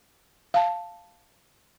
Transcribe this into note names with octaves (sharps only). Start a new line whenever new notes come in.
F5 A5